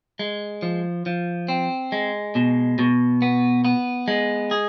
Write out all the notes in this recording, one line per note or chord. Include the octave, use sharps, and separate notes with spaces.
G#3
F3
F3
C4
G#3
B2
B2
B3
B3
G#3
G#4